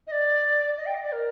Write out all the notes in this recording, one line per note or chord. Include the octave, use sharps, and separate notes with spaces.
D#5
D5
D#5
G5
D#5
D5
A#4